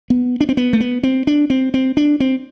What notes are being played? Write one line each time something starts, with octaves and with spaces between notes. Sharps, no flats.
B3
D4
C4
B3
A3
B3
C4
D4
C4
C4
D4
C4